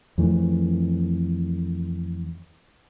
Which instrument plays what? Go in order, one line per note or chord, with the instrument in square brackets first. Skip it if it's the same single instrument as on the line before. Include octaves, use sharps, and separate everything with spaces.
[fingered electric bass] F2 E3 A3